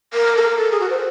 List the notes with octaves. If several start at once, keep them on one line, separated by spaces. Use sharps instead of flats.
A#4
A4
A#4
A4
G#4
F#4
C5